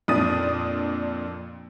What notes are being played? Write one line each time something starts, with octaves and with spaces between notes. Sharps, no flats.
F2 A#2 D4 D#6 A6 D#7